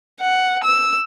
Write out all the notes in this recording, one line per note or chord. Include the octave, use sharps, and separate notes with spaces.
F#5
E6